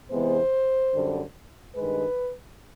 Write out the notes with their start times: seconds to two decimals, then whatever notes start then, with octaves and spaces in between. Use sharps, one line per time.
0.10 E2 C3 E3 G#3 B3 C5
0.93 F#2 D3 G3
1.75 G2 D#3 G#3 B4